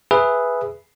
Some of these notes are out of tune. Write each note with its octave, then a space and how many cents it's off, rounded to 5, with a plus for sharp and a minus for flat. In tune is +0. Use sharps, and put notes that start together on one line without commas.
G#4 +0 B4 +0 E5 +5